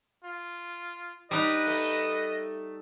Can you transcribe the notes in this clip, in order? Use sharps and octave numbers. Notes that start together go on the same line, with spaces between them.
F4
G3 D#4 B4 D#5
A3